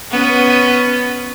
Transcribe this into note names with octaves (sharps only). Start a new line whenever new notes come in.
B3 C#4